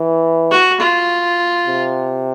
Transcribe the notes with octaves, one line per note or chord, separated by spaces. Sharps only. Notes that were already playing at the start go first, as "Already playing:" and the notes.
Already playing: E3
F#4
F4
C3